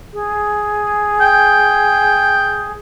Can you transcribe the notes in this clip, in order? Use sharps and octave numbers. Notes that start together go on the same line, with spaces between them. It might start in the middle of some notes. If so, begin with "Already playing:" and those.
G#4
G5